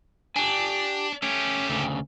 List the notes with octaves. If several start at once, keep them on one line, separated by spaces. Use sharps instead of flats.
D4 G4 G#5
A3 C#4 G4
D2 C#3